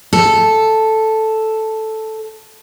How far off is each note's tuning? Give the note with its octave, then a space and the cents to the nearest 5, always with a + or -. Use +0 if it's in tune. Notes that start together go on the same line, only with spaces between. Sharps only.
A4 +0